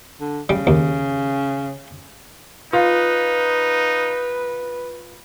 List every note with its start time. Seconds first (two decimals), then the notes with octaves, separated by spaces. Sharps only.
0.21 D3
0.49 C#3 G3
0.67 D#2
2.73 D#4 F4 B4